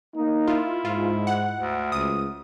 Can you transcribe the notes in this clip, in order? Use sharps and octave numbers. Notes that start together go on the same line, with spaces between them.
A#3 D#4
E4 F4
G#2 F4
F#5
D2
C#2 D#6